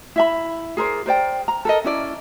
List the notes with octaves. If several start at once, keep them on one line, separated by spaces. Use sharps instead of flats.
E4 E5 B5
G#4 A#4 C5 D5
A#4 C5 D5 G5
A#5
A4 A#4 D#5
C#4 E4 D5